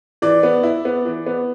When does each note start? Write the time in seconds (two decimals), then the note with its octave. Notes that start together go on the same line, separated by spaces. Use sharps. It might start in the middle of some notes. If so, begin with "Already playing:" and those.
0.22 E3 D5
0.43 B3
0.63 E4
0.85 B3
1.05 E3
1.26 B3